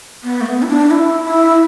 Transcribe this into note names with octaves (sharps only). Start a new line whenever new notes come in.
B3
A3
B3
E4
D4
E4
E4